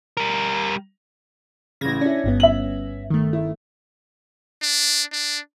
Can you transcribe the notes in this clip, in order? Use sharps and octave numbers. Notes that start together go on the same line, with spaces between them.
G3 A#4
A1 C#3 G#6 A#6
C#4 D4 E4
G1 G2 B3
E5 F#7
D#3 A3
E4
D4
D4